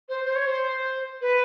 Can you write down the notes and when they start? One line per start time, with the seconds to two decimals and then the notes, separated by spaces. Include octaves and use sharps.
0.08 C5
0.25 C5
0.35 C#5
0.46 C5
1.21 B4